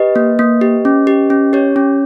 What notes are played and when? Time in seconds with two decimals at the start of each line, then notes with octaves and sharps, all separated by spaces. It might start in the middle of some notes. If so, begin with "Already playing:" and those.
Already playing: G4 B4 D#5
0.16 A#3
0.39 A#3
0.61 G4
0.85 C#4
1.07 G4
1.30 C#4
1.53 G4 C#5
1.76 C#4